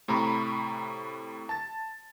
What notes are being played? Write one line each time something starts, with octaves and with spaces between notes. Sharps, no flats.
A2 C3 A#5 B5 C#6
A5 A6